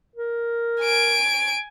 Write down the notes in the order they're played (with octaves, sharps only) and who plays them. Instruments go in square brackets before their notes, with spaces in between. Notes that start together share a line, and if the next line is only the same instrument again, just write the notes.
[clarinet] A#4
[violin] G#5 D7